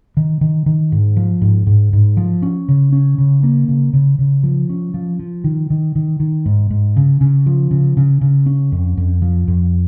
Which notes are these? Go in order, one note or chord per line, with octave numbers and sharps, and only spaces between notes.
D#3
D#3
D#3
G#2
F3
G#2
G#2
G#2
F3
C#4
C#3
C#4
C#3
A#3
C#3
C#3
C#3
F3
C#4
F3
F3
D#3
D#3
D#3
D#3
G#2
G#2
C#3
C#3
F3
C#3
C#3
C#3
C#4
F2
F2
F3
F2